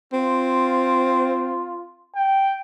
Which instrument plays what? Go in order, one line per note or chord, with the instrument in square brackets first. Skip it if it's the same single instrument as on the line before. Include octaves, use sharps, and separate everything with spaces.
[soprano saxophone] C4 [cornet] F4
[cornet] G5